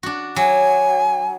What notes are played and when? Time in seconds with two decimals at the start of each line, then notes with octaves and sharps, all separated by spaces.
0.03 D4 F#4
0.36 F#3 G#5